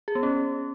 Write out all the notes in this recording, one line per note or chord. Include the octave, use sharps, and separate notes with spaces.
G#4
B3
C#4